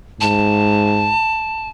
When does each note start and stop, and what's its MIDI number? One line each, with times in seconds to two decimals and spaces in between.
0.21 1.15 44
0.21 1.69 81